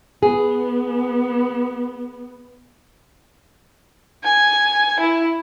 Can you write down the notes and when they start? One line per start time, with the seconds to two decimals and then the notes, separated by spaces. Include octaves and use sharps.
0.23 B3 G#4
4.24 G#5
5.00 E4